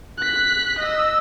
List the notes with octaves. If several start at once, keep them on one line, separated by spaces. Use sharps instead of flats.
F#6 B6
D#5 E6